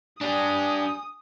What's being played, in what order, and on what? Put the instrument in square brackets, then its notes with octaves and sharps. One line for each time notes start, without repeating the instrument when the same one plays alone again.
[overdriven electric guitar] D4 G4 [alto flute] G#5 [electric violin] D#6